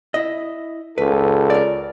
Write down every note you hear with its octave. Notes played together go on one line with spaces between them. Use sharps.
E4 D#5
C#2 A4 B4
A#4 D5